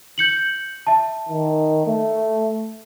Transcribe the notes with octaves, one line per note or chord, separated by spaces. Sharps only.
G6 C#7 F#7
E5 A5
D#3
A3